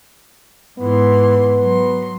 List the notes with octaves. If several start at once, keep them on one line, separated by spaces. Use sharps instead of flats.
G#2 E3 B3 C6
F#3 C6